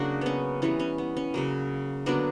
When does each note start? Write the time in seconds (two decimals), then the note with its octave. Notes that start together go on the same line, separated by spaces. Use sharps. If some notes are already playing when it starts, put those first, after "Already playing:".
Already playing: C#3 F#3 A#3 D4 F#4
0.21 B3 C#4
0.62 E3 G3 B3 C#4
0.79 C#4
0.98 B3
1.17 C#4
1.34 C#3 F#3 A#3
2.06 D3 F#3 A#3 B3 D4